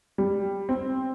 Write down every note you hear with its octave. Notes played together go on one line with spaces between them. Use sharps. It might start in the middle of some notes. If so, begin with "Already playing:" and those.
G3
C4